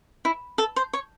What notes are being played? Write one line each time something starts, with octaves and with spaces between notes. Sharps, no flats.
E4
A4
C5
C#5